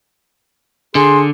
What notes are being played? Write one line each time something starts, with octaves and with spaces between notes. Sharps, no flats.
D3 G#4 C6